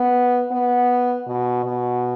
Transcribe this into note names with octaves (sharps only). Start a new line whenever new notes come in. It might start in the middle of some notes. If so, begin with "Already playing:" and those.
Already playing: B3
B3
B2
B2